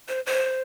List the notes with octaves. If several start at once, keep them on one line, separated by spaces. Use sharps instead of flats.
C5
C5